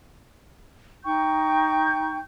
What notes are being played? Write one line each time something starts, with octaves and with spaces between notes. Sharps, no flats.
D#4 G5 C#6 G6